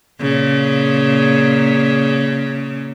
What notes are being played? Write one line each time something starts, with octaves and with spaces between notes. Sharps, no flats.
A#2 C#3